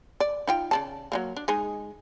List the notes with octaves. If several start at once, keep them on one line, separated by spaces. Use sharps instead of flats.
D5
D#4 F4 G5
C#3 D5 A5
F#3 G3 A#3
D4
G#3 D#4 G#4